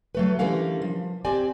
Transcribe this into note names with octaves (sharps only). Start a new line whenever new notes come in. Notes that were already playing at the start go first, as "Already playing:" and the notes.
F#3 A3 B4
D3 E3 G3 A#3 C#4 F5
F3
C4 G4 D5 G#5